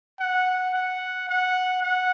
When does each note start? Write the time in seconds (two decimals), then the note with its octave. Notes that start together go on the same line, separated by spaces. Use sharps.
0.20 F#5
0.74 F#5
1.29 F#5
1.82 F#5